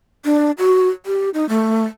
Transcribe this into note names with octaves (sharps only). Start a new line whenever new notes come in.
D4
F#4
G4
D#4
A3